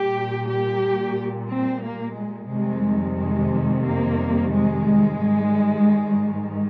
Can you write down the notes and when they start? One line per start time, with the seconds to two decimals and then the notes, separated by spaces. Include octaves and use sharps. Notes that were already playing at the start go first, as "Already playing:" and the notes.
Already playing: A#2 G3 G4
0.48 G4
1.49 C4
1.83 A#3
2.16 G#3
2.50 F2 C3 D#3 G3 G#3
3.18 G#3
3.85 A#3
4.53 G#3
5.20 G#2 D#3 G3